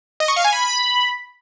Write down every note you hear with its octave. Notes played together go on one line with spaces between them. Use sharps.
D#5
C#6
F5
G#5
B5